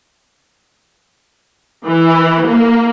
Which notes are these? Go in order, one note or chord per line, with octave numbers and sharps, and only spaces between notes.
E3
A#3